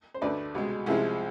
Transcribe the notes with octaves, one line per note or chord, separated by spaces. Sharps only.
C5
D2 D3 A3 B4 D5
C2 B2 G#3
C2 C3 F3 G#3 E4 G#4